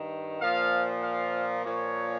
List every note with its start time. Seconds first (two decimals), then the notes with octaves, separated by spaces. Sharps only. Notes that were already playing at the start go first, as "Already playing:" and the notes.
Already playing: G2 D#3
0.41 A#2 F3 F5
1.02 F5
1.65 A#2 F3 C#5